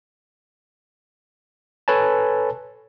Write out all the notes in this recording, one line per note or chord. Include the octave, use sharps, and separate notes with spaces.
A4 B4 C#5 G#5 A5